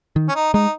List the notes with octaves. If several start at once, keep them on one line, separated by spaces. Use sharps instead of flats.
D#3
C#4
D#4
G#3 D#4